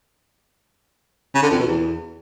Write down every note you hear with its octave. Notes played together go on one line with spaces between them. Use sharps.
C#3
D3
F2
B2
E2